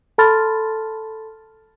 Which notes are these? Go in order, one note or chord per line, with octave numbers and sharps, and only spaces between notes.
A4 A5 B5 C6 F6 A6